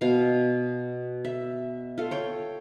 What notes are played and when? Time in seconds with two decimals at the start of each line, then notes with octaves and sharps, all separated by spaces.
0.01 B2 F5
1.25 E5
1.98 F4 A4
2.11 C#5 G5